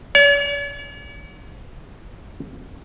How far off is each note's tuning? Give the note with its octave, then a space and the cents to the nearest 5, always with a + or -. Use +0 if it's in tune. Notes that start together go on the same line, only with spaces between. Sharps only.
C#5 +45